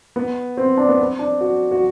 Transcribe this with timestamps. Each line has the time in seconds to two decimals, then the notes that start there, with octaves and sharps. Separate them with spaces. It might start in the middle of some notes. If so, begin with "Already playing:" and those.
0.16 B3
0.57 C4
0.77 D4
0.89 B3
0.99 C4
1.19 D4
1.41 F#4
1.71 F#4